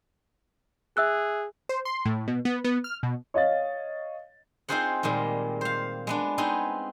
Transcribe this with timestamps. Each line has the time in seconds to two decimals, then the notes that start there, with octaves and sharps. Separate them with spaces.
0.97 G#4 E5 E6 F#6
1.69 C5
1.85 C6
2.05 A2
2.28 B2
2.45 B3
2.64 B3
2.84 F6
3.03 B2
3.34 C#5 D#5 F5 A6
4.69 C4 D#4 F4 G#4 C5 F#5
5.03 A#2 D#3 G3 G#3
5.61 C5 F5
6.07 G#3 B3 D4
6.38 B3 C4 D#4 G#4